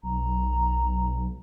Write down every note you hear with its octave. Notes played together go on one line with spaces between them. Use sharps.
B1 A#5